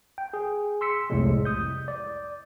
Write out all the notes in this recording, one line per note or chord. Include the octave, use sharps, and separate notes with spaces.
G5
G#4
C6 E6 B6 C#7
C2 F2 A2 C3 G3 G#3
D#6 G6
D5